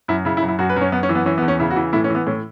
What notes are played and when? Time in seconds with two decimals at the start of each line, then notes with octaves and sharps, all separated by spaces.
0.08 F#2 E4
0.25 C#3 E4
0.37 E4
0.42 F#2
0.48 E4
0.59 F#2 F#4
0.70 B4
0.76 F#2
0.81 C#4
0.92 F#2 B3
1.03 C#4
1.09 E3
1.15 B3
1.26 E3 C#4
1.38 B3
1.42 E2
1.48 C#4
1.60 C#3 E4
1.70 F#4
1.76 E3
1.93 A2 E4
2.04 C#4
2.10 E3
2.15 B3
2.27 A2 C#4